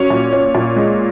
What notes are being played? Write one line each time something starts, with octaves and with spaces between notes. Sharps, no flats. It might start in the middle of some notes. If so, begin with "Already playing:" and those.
Already playing: F#3 C#4 C#5
A#2
C#4
A#2
G#3